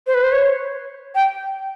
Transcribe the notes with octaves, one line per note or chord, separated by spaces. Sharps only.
C5
B4
C5
C#5
G5